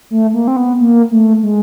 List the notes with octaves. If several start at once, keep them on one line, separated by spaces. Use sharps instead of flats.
A3
A#3
C4
B3
A#3
A3
G#3